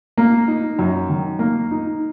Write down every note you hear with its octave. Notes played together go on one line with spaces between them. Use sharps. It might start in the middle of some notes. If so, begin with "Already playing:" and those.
A#3
D#4
F#2
D#3
A#3
D#4